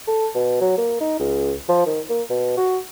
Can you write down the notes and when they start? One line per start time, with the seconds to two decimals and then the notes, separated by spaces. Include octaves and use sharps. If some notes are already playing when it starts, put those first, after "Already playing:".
0.07 A4
0.34 B2
0.61 F#3
0.77 A#3
1.01 D#4
1.19 C#2
1.69 F3
1.86 D#3
2.09 A#3
2.30 B2
2.57 F#4